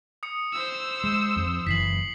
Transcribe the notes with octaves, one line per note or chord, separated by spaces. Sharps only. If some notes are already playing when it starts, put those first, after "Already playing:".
D#6 C#7
C5 E6
G#3
F2
F#1 E3 B6 C7 F#7